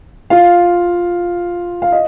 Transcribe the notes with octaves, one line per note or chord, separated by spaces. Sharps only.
F4 F5
F5
D#5